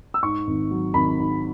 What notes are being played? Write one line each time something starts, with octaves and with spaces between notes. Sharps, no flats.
E6
G#2 C#6
G#1
F#3
G#1 B5
G#2